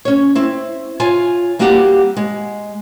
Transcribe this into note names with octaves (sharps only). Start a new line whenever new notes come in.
C#4 C#5
C4 E4
F4 C#5 G#5
G3 A#3 C4 F#4 G4 F#5
G#3